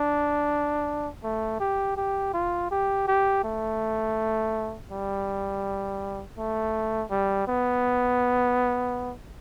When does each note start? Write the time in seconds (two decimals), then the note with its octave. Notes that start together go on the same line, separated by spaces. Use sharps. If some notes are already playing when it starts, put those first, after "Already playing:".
Already playing: D4
1.24 A3
1.60 G4
1.97 G4
2.34 F4
2.71 G4
3.08 G4
3.45 A3
4.91 G3
6.38 A3
7.11 G3
7.48 B3